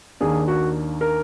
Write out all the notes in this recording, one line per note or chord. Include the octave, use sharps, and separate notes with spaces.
D#2 D#3 A#3 D4 G#4
F#4
A#4